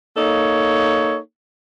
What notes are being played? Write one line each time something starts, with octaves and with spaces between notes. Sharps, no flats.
A#3 D#4 A4 C#5